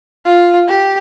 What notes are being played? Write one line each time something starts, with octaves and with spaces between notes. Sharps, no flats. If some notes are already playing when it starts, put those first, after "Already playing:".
F4
G4